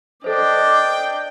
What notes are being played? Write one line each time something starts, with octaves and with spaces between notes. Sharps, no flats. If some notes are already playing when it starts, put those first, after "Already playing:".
D4 A4 C5 D5 D#5 G5